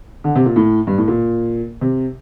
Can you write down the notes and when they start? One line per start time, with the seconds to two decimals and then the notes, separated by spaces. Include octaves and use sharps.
0.24 D3
0.36 C3
0.46 A#2
0.56 A2
0.87 G2
0.98 A2
1.08 A#2
1.81 C3